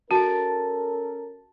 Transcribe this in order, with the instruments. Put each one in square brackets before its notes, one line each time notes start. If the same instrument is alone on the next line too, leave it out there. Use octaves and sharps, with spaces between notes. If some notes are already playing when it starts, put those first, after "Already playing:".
[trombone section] C#4 A4 A#4 [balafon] F#4 [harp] A5 D7